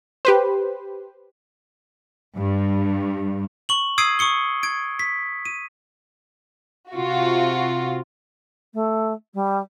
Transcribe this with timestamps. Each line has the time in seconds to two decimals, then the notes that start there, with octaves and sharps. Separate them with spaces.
0.25 G4 B4 C5
2.37 G2
3.69 C#6 F#7
3.98 D#6 E6 G#6 C7 D7 D#7
4.19 C#6 D#6 C#7 G7
4.63 G#6 D7
4.99 B6
5.45 D#7
6.92 C3 F4 F#4
8.74 A3
9.34 G3